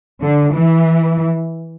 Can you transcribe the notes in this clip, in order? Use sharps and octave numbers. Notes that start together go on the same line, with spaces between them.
D3
E3